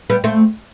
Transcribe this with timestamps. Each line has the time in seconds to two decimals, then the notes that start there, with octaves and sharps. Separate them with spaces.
0.10 G3 B3
0.24 A3 C4